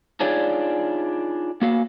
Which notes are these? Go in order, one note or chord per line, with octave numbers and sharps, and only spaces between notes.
D4 D#4 F4 G#4 C#5 D5
A#3 F#4 F5